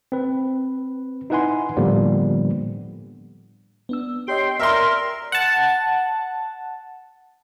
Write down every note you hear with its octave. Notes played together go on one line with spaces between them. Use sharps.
C4 B4
D#4 E4 B4 F#5 G#5 C6
A2 D3 F3 G3 A#3 B3
B3 D4 E6
G4 C#5 D#5 G5 C6
A#4 D5 E5 A#5 C6
F#5 A5